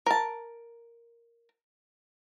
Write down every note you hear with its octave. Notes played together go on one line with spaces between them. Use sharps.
A#4 A5